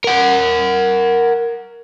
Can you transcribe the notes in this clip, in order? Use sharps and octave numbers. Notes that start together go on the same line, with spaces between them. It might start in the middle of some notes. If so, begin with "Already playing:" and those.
A#4 F#5